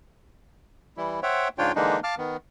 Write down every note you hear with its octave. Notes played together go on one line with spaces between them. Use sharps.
E3 G3 E4
C5 C#5 E5 F#5 G5
G#2 C#3 D4 F4 C#5 G5
D3 E3 G#3 A#3 D4 D#4
F5 A5 D6 F6
D#3 B3